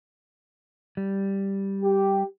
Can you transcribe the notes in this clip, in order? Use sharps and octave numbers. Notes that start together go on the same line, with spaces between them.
G3
G4